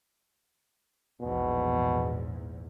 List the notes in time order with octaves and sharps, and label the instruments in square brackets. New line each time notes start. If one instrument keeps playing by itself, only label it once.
[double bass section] A#1 E2 G#2 [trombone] B2